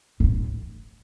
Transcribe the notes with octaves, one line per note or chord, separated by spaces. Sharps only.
A#2
A2